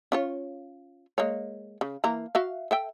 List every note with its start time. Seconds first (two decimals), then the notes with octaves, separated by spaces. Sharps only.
0.12 C#4 F4 C#5
1.18 G#3 A#3 C#5
1.81 C#3
2.04 E3 A#3 A#5
2.35 F#4 E5 F5
2.71 A4 E5 G5